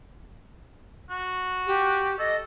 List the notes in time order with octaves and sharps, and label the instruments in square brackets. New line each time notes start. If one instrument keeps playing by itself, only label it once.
[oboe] F#4
[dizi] G4
[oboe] A4 [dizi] D#5